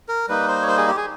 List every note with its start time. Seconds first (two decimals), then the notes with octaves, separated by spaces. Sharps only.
0.08 A#4
0.28 G3 A#3 D#4 B4
0.48 C5
0.62 C#5
0.68 C5
0.77 G#4
0.88 G4
0.97 G#4